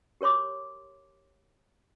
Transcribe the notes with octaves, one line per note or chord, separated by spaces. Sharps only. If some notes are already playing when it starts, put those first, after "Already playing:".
G4 A#4 C#5 C6 D6